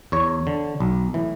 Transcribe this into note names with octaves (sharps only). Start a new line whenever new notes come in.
E2 C#5
D3
B1
A2 E3